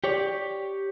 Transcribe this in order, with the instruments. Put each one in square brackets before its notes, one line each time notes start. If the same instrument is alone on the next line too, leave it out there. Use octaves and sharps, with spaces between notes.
[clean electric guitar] G4 C#5 D5